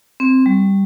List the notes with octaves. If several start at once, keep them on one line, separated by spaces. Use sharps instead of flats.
C4
G3